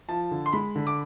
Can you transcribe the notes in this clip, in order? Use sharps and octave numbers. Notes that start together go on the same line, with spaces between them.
F3 A5
D3
C6
G#3 B5
D3
D6